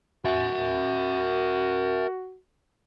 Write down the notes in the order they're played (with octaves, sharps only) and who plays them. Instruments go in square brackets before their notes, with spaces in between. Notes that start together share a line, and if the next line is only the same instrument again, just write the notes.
[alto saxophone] F#4 [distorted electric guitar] A#4 E5